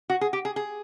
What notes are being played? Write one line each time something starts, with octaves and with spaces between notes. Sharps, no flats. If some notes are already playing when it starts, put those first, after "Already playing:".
F#4
G#4
G4
G#4
G#4